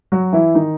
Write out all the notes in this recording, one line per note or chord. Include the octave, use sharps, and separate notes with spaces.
F#3 F#4
E3 E4
D#3 D#4